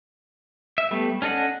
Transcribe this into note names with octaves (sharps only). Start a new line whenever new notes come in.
E5
G3 A3 B3
C#4 D4 A4 D#5 F#5